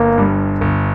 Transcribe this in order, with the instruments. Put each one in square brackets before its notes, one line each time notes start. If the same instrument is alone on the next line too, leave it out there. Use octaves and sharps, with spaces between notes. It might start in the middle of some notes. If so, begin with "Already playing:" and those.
Already playing: [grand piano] G1 [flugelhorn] A#3
[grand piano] G2 G3
G1